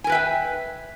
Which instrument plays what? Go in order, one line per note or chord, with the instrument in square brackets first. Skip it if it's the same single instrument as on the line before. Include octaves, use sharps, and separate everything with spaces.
[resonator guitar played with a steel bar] G#5
A#4
B4
E5
G5